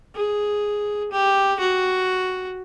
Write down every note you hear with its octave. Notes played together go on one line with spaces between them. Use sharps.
G#4
G4
F#4